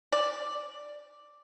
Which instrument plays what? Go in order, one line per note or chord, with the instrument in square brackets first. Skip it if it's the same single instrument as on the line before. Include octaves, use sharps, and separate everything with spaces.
[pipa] D5